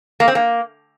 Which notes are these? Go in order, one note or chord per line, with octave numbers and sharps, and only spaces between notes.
A#3
C4
A#3